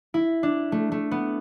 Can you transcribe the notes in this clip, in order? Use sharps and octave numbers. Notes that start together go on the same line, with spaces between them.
E4
D4
A3
A3
B3